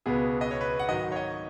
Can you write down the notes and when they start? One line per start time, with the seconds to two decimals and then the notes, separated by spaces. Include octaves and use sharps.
0.06 C#2 B2 B3 G#4
0.41 D#5
0.51 C#5
0.61 B4
0.80 F#5
0.89 G#2 D#3 F#3 D#5
1.12 C#5
1.16 D#5